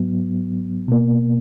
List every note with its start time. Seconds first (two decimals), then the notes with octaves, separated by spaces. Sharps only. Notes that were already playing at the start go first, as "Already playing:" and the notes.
Already playing: G#2 F#3 B3
0.88 B2 A#3